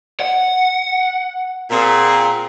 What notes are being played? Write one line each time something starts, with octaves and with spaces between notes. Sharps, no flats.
F#5
A#2 C4 G#4